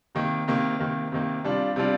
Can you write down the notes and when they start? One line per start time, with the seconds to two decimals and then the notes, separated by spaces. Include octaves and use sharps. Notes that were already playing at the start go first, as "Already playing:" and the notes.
0.15 C3 D#3 A#3
0.48 C3 D#3 A#3
0.79 C3 D#3 A#3
1.12 C3 D#3 A#3
1.44 C3 G3 D4 F4
1.76 C3 G3 D4 F4